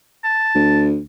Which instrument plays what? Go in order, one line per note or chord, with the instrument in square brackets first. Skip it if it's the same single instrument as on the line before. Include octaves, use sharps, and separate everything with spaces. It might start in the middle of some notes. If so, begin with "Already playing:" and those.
[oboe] A5
[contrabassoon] D2